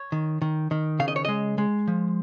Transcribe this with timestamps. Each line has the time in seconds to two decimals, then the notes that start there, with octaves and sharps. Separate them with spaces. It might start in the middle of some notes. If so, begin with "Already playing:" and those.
Already playing: C#5
0.12 D#3
0.42 D#3
0.71 D#3
0.99 C#3 F5
1.08 D#5
1.16 C#5
1.25 G#3 D#5
1.58 G#3
1.88 F3